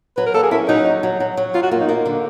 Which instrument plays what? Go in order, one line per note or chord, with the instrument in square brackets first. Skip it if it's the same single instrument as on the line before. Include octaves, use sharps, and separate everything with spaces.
[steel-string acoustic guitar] F#3 [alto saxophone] B4
[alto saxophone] A#4
[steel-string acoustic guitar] A#3 [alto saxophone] A4
[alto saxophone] G#4
[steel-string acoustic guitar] C#4 [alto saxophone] E4
[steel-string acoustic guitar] F#3 [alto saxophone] D#4
[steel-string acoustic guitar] D#2
F#3
F#3
F#3
[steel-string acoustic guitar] F#2 [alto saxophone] F4
[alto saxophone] F#4
[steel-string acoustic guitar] A#3 [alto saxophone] F4
[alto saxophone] D#4
[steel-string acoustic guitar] A#3
D3